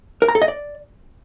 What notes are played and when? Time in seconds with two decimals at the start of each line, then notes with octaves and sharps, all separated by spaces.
0.22 A#4
0.28 A#5
0.35 A4
0.42 D#5
0.48 D5